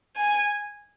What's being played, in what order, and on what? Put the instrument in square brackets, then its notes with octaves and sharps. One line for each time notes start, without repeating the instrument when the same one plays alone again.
[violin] G#5